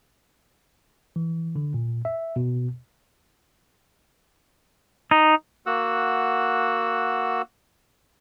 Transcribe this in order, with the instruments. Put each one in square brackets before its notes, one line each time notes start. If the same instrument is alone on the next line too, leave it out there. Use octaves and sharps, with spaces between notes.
[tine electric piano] E3
D3
A#2
E5
B2
[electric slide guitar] D#4
[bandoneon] A#3 F#4 F#5 E6